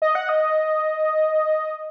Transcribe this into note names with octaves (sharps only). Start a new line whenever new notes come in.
D#5
F#5
D#5